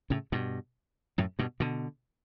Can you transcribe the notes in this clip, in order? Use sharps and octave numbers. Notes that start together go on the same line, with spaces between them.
A2 C#3
G2 B2
F#2 A2
G2 B2
B2 D3